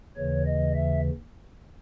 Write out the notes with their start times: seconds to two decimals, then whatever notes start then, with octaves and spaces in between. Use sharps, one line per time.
0.17 D#2 C#3 E3 C#5
0.46 D#5
0.74 E5